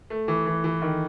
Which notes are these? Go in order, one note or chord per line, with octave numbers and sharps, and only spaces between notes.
A3
E3
E3
E3
D#3